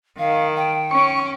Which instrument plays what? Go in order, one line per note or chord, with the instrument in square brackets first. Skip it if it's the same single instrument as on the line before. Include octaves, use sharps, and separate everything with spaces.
[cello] D#3 [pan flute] F5
[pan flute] G5
[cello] C#4 [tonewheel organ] C#6